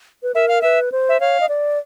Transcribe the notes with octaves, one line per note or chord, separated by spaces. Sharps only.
B4
A#4 E5
F5
B4 E5
C5
E5
C#5 F5
D#5
D5